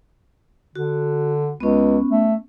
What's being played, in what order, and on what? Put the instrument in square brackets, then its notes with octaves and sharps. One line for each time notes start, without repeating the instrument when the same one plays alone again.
[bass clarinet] D3 [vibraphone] F#4
[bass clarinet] C#2 [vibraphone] B3 C#4
[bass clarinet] A3